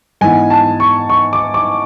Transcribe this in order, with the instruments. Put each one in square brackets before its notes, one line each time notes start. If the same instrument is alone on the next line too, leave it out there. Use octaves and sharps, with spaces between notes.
[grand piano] G#2 E3 B3 G#5
A5
C#6
C#6
D6
D6